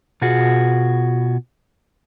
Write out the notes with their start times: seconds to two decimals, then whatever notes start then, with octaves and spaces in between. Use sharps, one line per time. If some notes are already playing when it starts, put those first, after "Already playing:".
0.22 B2 F4 F#4 G#4